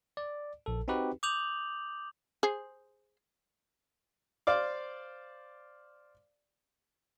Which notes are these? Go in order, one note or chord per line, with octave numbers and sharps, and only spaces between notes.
D5
A#1 A4
C4 D#4 F#4 G4 B4
D6 D#6 G6 F7 F#7
G#4 C5
C5 D5 F5 D6